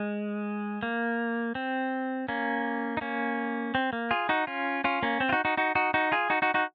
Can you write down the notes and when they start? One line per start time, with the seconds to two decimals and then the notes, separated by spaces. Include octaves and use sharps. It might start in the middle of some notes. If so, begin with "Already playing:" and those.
Already playing: G#3
0.83 A#3
1.55 C4
2.28 A#3 C#4
2.97 D#4
3.01 A#3 C#4
3.75 C4
3.93 A#3
4.11 F4 G#4
4.29 D#4 F#4
4.47 C#4 F4
4.84 C#4 F4
5.03 A#3 C#4
5.20 C4
5.29 F4
5.32 D#4 F#4
5.45 D#4 F#4
5.57 D#4 F#4
5.75 D#4 F#4
5.94 D#4 F#4
6.12 F4 G#4
6.30 D#4 F#4
6.42 D#4 F#4
6.54 D#4 F#4